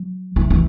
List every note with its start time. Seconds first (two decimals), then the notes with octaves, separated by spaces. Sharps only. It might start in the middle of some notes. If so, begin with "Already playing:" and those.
Already playing: F#3
0.36 E3
0.50 E3